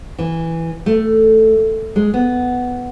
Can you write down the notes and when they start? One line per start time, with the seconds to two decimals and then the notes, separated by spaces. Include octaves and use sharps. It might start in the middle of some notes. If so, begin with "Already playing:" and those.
0.18 E3
0.86 A3
1.96 G#3
2.14 B3